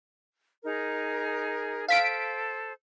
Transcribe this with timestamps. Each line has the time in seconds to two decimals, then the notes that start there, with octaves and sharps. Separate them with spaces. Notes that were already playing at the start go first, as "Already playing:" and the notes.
0.63 D#4 G#4 A#4
1.88 A4 C5 F5 B6 D7